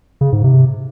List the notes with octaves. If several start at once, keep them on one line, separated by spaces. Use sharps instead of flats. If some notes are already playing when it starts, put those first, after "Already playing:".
C#3
G#2
C3